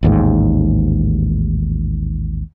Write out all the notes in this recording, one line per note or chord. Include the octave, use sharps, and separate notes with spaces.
A1 D#2 G#2